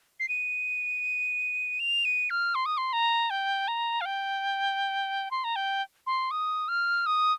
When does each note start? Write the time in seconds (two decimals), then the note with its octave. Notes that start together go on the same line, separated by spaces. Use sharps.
0.20 C7
0.29 D#7
1.80 F7
2.05 D#7
2.30 F6
2.55 C6
2.66 D#6
2.77 C6
2.93 A#5
3.30 G5
3.68 A#5
4.01 F5
4.05 G5
5.31 C6
5.44 A#5
5.56 G5
6.07 C6
6.31 D#6
6.68 F6
7.06 D#6